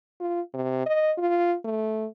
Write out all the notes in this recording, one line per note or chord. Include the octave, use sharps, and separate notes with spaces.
F4
C3
D#5
F4
A3